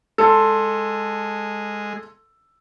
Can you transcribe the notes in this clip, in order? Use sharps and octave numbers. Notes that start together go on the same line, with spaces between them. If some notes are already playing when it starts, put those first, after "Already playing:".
G#3 A4 C6